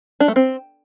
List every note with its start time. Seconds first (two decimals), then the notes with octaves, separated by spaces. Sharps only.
0.20 D4
0.28 A3
0.36 C4